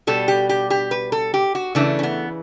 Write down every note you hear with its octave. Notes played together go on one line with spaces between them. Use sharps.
B2 G3 A4
G4
G4
G4
B4
A4
G4
F#4
C#3 E3 A3 D4
C#4
B3